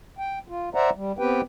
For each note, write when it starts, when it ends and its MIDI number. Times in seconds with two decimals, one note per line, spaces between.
0.18 0.39 79
0.48 0.69 65
0.75 0.90 72
0.75 0.90 74
0.75 0.90 76
0.75 0.90 78
0.75 0.90 82
0.95 1.12 55
1.19 1.41 59
1.19 1.41 60
1.19 1.41 67
1.19 1.41 71
1.19 1.41 79